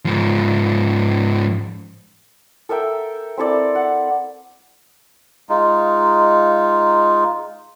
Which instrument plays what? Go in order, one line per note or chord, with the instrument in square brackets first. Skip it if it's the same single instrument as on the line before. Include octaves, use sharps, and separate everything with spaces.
[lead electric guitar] G#2 F3
[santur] A4 A#4 E5 G5
C4 E4 A4 D5
F#5
[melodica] G#3 D#4 F4